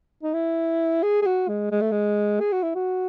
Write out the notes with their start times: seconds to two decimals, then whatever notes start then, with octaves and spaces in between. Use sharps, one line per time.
0.23 D#4
0.33 E4
1.03 G#4
1.22 G#4
1.26 F#4
1.48 G#3
1.71 G#3
1.81 A3
1.92 G#3
2.40 G#4
2.52 F#4
2.63 E4
2.75 F#4